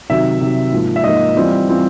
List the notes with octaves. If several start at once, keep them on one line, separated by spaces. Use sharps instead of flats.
C3 D#3 F#3 E5
C3 D#3 F#3
G#2 F3 A#3
E5
G#2 F3 A#3 D#5
E3 G3 C4 F4
E3 G3 C4 F4